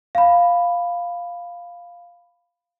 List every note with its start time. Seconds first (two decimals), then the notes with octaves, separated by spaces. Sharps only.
0.15 F5 B5